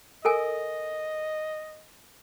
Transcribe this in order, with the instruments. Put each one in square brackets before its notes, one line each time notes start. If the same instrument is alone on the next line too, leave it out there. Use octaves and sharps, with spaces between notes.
[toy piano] A4 A#4 G#5 [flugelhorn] D#5